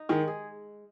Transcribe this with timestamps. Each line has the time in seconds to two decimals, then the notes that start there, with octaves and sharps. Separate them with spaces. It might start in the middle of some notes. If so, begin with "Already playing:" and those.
Already playing: D#4
0.09 D#3 G#3
0.28 G#4